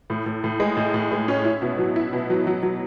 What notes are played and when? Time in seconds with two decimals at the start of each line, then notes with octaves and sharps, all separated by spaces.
0.10 A2
0.26 A2
0.44 A2
0.60 G#3
0.77 A2
0.94 A2
1.12 G#3
1.28 C#4
1.45 E4
1.62 B2
1.78 F#3
1.96 E4
2.13 B2
2.30 F#3
2.47 F#3
2.63 F#3